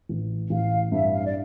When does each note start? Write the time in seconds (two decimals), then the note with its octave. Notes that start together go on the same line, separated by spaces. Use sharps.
0.09 A1
0.50 A1 F5
0.92 G2 E5
1.12 F5
1.25 D5